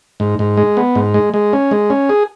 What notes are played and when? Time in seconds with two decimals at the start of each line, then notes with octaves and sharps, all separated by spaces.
0.20 G#2
0.39 G#2
0.57 G#3
0.77 B3
0.95 G#2
1.14 G#3
1.34 G#3
1.53 C#4
1.71 G#3
1.90 C#4
2.09 G#4